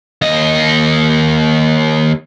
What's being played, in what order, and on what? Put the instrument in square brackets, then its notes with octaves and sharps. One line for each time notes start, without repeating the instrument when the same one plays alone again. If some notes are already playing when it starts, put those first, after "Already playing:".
[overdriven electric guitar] D#2 D#5